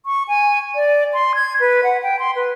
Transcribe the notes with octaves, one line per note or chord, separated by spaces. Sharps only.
C#6
G#5
D5
C6
G#6
B4
F#5
G5
C6
B4